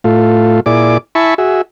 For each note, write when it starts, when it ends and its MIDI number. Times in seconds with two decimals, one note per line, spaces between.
0.04 0.60 45
0.04 0.60 57
0.04 0.60 65
0.66 0.98 46
0.66 0.98 64
0.66 0.98 68
0.66 0.98 74
0.66 0.98 86
1.15 1.34 64
1.15 1.34 76
1.15 1.34 80
1.15 1.34 81
1.15 1.34 83
1.15 1.34 85
1.38 1.62 66
1.38 1.62 68
1.38 1.62 76